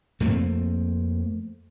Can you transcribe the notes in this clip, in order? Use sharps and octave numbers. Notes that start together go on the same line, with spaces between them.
F2 A3 A#3 C4